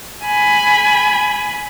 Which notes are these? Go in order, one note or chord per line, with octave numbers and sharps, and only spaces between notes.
G#5 B5